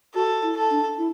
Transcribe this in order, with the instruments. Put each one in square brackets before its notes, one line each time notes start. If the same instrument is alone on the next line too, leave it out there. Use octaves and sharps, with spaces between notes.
[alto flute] F#4 [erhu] A4
[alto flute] E4
[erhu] A4
[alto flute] D4
E4